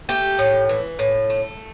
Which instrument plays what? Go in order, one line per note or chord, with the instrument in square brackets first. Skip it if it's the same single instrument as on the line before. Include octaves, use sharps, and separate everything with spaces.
[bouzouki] A3 G4
A2
E3
A2
A3